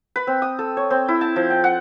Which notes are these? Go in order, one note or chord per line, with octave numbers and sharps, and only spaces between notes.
B4
C4
D#6
A4
C#5
C4
E4
A5
F3
G5
F#5